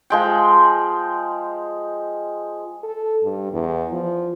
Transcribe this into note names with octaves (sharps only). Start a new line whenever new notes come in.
F3 G#3 G5
A4
G2
E2
F3